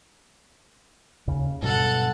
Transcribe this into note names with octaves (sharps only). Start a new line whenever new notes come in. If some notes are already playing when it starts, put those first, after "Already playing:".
D#2 C#3
G2 B2 F#3 A4 F#5